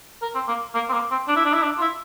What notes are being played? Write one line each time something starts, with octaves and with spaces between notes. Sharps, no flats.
A#4
C4
A#3
A#3
C4
A#3
C4
D4
E4
D4
E4
D4
F4
E4